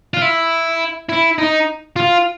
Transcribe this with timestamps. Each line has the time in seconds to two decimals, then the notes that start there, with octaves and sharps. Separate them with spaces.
0.14 F4
0.22 E4
1.09 E4
1.38 D#4
1.96 F4